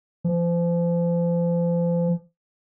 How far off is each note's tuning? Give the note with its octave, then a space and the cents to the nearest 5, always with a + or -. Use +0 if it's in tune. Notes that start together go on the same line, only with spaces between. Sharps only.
F3 -35